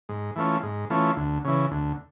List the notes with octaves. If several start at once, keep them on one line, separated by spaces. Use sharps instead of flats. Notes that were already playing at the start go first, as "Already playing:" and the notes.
G#2
E3 A3 C#4 F4
G#2
E3 A3 C#4 F4
D2
C#3 E3
D2